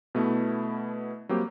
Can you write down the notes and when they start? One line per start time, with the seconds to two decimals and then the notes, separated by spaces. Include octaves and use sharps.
0.15 B2 A3 B3 E4
1.29 F#3 G3 A#3 C4 G4